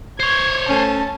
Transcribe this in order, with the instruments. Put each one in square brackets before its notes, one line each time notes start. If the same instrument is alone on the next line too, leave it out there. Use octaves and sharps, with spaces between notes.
[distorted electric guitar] C5 C#5 [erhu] G#6
[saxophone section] A3 C#4 [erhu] A5